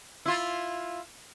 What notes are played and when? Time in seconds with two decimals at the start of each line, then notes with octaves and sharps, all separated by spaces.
0.26 E4 F4